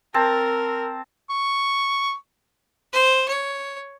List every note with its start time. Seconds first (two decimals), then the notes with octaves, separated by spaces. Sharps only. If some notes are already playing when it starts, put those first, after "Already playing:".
0.14 C4 A#4 A5
1.29 C#6
2.93 C5
3.28 C#5